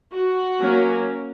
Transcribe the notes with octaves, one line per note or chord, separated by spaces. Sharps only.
F#4
F#3 A#3 C#4